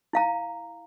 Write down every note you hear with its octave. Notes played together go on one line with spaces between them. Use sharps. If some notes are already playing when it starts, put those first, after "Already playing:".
E4 F5 A#5